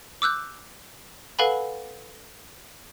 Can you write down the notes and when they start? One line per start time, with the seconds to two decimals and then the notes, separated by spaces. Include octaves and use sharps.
0.22 D6 E6 F#6 G6
1.39 A4 B4 F5 F#5 G#5 B5